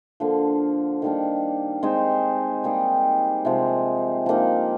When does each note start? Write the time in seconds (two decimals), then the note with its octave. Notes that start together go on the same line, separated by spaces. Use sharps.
0.20 D3 F3 A#3
1.02 D#3 G3 A#3 D4
1.83 G#3 C4 D#4 G#4
2.64 G3 A#3 D#4 G#4
3.45 C3 F3 G#3 C4
4.26 F3 A#3 D#4